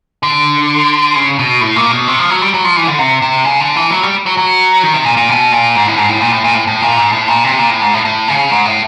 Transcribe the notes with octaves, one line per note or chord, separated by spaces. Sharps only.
D3
C#3
B2
A2
A#2
B2
C3
F3
F#3
G3
F#3
F3
E3
D3
C3
C3
C#3
D3
E3
F#3
G3
F#3
F#3
D#3
C3
A#2
A#2
B2
A#2
G#2
A2
G#2
A2
A#2
A2
A#2
A2
A2
A#2
G#2
A2
A#2
C3
A#2
A2
G#2
A2
A2
C#3
G#2
A2